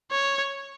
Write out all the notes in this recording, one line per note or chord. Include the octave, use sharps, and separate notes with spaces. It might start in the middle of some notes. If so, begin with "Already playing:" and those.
C#5